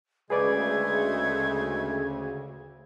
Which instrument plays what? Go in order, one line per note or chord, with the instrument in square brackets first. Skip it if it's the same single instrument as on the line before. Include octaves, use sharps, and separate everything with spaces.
[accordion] D2 C#3 [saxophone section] G#3 A3 [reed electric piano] G#4 B4 D5 [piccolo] G#6